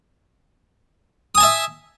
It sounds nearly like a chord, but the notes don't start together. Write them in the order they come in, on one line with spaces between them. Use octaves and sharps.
D#6 G#5 A5 E5